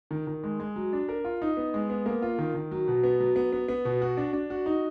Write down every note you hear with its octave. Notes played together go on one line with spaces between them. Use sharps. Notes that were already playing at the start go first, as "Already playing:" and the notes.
D#3
D#3
G#3
G#3
F#3
D4
A#4
F4
D#4
B3
G#3
B3
A#3
F4
D#3
D#3
F#3
B2
B3
F#3
B3
B3
B3
B2
F#4
D4
D4
F#4
D#4